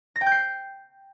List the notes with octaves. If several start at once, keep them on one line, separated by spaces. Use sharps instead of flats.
A#6
G5
G6
C7